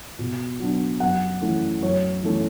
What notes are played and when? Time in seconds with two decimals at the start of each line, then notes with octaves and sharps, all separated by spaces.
0.19 B2
0.60 F#3 B3 D4
1.00 F#2 F#5
1.41 E3 A3 C#4
1.82 F#2 C#5
2.23 E3 A3 C#4